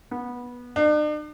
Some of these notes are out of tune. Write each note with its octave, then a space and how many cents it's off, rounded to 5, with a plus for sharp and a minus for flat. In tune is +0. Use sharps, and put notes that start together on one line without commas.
B3 -15
D4 +45